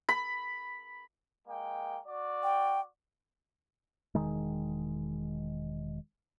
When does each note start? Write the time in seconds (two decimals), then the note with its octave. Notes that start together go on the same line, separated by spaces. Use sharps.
0.09 B5
1.47 G#3 A#3 G5
2.06 F#4 D5
2.43 G5
4.15 E1 D#3 G#3